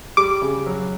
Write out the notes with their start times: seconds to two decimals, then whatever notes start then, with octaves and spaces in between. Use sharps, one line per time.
0.17 G3 D6
0.42 C#3
0.66 F#3